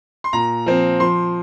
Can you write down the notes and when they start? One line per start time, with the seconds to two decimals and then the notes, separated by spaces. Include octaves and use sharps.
0.24 C6
0.33 A#2 A#5
0.66 F3 C4
1.00 F3 C6